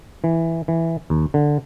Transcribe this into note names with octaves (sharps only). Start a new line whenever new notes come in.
E3
E3
D#2
D3